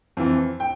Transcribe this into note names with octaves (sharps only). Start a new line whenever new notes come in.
F2 E3
G5